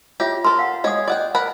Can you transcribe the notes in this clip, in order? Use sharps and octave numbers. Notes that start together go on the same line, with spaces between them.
F4 G4 C#5 E5
A4 A#4 C6
F5 F#5
G#3 C#5 D#5 D#6
D5 D#5 F#5 G5
A#4 F#5 B5